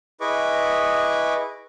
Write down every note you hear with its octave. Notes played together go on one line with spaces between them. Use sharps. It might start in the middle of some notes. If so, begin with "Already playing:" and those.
E4 G#4 B4 D#5 C#6 D6